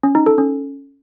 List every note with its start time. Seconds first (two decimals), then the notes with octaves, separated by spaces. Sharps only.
0.03 C#4
0.15 D#4
0.26 A4
0.38 C#4